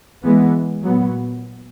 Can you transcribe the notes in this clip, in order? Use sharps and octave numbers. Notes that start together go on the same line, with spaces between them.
E3 G#3 B3
A#2 F#3 B3